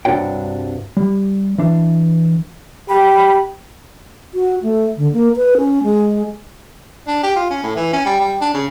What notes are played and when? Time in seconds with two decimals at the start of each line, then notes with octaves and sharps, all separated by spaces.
0.05 C2 G2 D4 F#4 C#5 G5
0.97 G3
1.58 E3 D4
2.89 G4 B5
4.34 F#4
4.63 A3
4.97 D3
5.13 A#3
5.36 B4
5.57 C#4
5.83 G#3
7.07 D4
7.23 G4
7.36 F4
7.50 C#4
7.63 A2
7.76 E3
7.93 C#4
8.05 G3
8.20 G3
8.41 D4
8.54 C#3